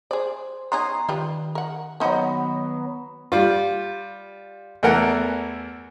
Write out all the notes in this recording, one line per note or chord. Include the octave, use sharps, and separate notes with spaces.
G#4 C5 D5
B3 D#4 G#4 C#5 A#5 C6
D#3 G3 F4 B4
A#4 F#5
F3 F#3 B3 D#4 C5
G3 F4
E2 E3 A3 A#4 F#5